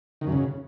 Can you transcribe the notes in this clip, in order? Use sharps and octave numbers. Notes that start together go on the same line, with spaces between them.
D#3
F#2
C#3